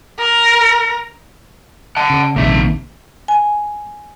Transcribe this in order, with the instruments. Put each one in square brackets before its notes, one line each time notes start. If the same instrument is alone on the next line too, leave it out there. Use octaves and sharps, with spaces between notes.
[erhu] A#4
[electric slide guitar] F#5 A5
[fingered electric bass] C#3
[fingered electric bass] A#1 C3 D#3 [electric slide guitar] A#3 E5
[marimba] G#5